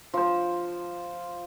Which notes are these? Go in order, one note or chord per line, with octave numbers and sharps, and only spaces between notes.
F3 C5